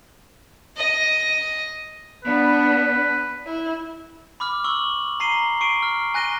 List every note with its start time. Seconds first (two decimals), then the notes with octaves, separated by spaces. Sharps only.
0.77 D#5
2.24 B3 D4 B4
3.45 E4
4.40 B5 D6 F6
4.64 C#6 E6 F#7
5.20 A#5 C7 D#7 G7
5.61 C#6 C7 D7 D#7
5.83 F6
6.14 G#5 F#6 A#6 D#7 G7